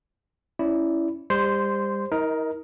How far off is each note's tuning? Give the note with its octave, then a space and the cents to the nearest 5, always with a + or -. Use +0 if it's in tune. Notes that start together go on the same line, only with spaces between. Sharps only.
C#4 -10 E4 +0 D5 -25
G3 +30 C5 +0 C6 -15
D#4 +45 A#4 +10 D#5 +15